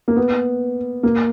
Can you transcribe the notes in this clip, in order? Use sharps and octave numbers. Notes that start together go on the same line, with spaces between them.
A#3
B3
A#3